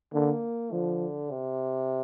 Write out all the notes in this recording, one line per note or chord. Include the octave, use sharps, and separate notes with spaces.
D3 A#3
D3 F3
C3